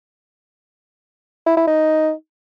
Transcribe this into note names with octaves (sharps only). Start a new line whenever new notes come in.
E4
E4
D#4